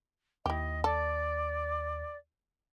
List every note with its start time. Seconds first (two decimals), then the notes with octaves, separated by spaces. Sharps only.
0.46 D#2 E4 G4 D#5
0.84 A4 D5